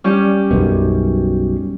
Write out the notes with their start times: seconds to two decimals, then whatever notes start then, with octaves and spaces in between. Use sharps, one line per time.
0.04 G3 C#4 G4
0.51 B1 F#2 B2